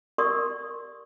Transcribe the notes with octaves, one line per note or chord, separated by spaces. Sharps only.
G4 A#4 D5 C6 C#6 D#6